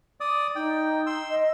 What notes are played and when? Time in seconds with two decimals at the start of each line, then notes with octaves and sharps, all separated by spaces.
0.20 D5 D#6
0.56 D#4 G5
1.06 C6 E6
1.30 D#5